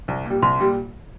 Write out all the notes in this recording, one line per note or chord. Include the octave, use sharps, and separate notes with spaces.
C2
A#2 G3
C2 C6
A#2 G3